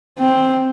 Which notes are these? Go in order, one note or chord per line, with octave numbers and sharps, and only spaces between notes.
C4